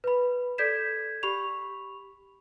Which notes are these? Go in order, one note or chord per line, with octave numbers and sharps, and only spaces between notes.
B4 B5
A4 D5 G6 G#6 B6 E7
G4 B5 C#6 F7